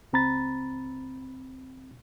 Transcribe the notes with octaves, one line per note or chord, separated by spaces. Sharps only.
C#2 C4 A#5 B5 A6